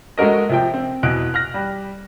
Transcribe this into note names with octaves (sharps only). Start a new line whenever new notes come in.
G#3 A3 F#4 A#4 D#5
C3 F3 G5
C4
E2 B2 F#6 D7
F6 F#6 A#6
G3